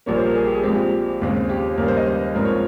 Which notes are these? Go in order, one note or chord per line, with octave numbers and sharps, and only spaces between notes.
A#1 A#2 G3 A#3 C#5
C5
A#4
G#4
G4
G#4
A#1 A#2 G#3 C4 G4
G4
D#2 C#3 G#3 C4
G4
D#2 C#3 G3 A#4
C5
D#5
C5
A#1 G#2 F3 C4 A#4
C#5